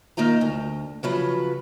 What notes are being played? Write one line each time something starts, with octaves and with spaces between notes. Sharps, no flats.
D#3 A#3 D#4 F4 A#5
D2
C#3 F3 F#3 F4 B4